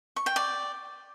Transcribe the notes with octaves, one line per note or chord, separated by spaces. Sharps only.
C#6
G5
D5